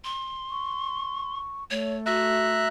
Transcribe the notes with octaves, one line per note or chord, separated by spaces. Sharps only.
C6
C#6
A3 C#5
F#4 E5 A#5 F#6